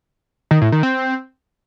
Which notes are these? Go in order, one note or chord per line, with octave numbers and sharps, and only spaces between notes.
D#3
A2
D#3
C4